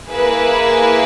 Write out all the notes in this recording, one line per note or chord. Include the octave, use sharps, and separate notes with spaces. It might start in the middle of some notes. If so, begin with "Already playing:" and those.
A#3 E4 G#4 B4